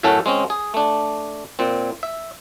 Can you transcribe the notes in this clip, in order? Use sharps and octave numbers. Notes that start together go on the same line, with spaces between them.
F#2 A2 A3 C#4 F#4 A4
G#3 C4 C#4
G#4
A3 D4
A#2 C4
E5